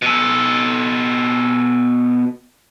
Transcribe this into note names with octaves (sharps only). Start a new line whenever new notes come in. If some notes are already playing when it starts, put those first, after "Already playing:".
B2 A4